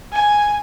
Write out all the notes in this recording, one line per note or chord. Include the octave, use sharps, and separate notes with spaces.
G#5